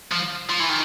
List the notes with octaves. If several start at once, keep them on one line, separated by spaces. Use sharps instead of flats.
F3
F3
E3
D#3